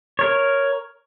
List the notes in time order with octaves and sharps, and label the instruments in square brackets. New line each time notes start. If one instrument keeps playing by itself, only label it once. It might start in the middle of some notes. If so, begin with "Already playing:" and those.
[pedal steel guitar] A#4 C#5